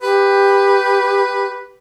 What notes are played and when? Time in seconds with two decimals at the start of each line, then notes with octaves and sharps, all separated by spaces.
0.02 G4 B4